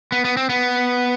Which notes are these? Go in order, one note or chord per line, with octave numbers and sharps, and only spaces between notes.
B3
B3
C4
B3